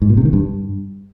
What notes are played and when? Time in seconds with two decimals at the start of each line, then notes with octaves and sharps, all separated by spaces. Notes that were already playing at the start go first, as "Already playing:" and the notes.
0.02 G#2
0.09 A#2
0.17 C3
0.25 D#3
0.33 G2